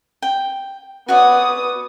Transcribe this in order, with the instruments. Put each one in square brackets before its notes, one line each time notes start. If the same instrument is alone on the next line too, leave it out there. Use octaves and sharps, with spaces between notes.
[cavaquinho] G5
[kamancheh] B3 D#6 [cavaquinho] F#4 C#5 D5